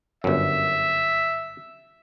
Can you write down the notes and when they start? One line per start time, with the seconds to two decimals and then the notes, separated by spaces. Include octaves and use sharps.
0.24 G1 F#2 E5